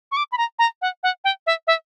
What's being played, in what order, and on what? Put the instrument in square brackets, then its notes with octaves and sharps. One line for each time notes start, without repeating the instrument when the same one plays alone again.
[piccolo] C#6
D6
B5
A#5
A#5
F#5
F#5
G5
E5
E5